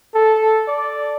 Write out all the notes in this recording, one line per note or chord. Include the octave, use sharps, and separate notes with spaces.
A4
D5